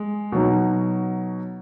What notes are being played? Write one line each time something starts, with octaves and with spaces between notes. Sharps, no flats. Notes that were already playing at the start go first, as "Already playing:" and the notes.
Already playing: G#3
B2 F#3 D#4